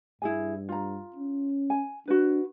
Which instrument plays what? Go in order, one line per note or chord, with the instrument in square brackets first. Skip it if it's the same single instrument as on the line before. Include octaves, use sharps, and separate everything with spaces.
[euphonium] G2 [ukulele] E4 G#4 G#5
[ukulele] F4 A#5
[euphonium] C#4
[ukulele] G#5
[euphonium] D4 [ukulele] F#4 B4